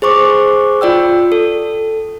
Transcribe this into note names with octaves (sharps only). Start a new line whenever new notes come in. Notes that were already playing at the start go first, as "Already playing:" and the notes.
G#4 C5 C#6 D6
F4 D5 G5 E6
A4